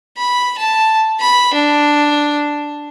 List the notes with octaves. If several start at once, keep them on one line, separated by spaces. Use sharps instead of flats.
B5
A5
B5
D4